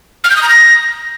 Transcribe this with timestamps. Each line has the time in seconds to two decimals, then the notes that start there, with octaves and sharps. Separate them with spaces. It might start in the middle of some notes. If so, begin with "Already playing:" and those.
0.24 F6
0.30 G6
0.36 D#6
0.43 A#5
0.49 A#6